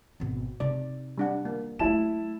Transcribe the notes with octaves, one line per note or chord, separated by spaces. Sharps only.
G#1 B2
C3 D#4 D5
G3 D4 F#5
A#3
F#3 A3 E4 A5 E7